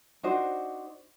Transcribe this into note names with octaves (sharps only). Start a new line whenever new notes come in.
D4 D#4 F#4 C5